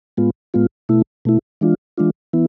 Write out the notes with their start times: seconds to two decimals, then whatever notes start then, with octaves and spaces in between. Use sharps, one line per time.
0.17 A2 G#3 B3 F4
0.54 A2 G#3 B3 F4
0.89 B2 A3 E4
1.25 B2 A3 E4
1.61 E3 G#3 D4 F4
1.98 E3 G#3 D4 F4
2.33 E3 B3 E4